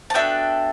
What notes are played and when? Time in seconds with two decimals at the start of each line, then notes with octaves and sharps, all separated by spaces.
0.10 A5
0.14 B3 D4 F#4 A4 E5 G5